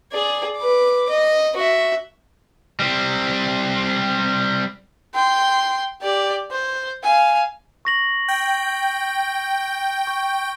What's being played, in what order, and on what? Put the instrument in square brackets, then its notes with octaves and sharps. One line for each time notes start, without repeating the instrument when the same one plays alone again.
[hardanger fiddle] G#4 D5
B4 D6
D#5
F#4 E5
[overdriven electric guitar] G3 C4
[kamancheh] G5 C6
G4 D5
C5
F5 G#5
[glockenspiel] C#6 A#6 F#7
[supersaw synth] G5
[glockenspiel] C#6